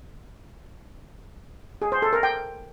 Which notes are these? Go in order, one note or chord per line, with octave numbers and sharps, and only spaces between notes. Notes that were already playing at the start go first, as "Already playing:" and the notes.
G#4
C5
A4
A#4
G5